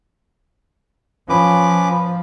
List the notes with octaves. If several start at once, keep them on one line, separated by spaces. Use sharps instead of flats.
F3 C#4 B4 D6